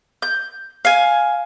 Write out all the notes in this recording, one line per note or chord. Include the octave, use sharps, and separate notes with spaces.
G6
F5 G#5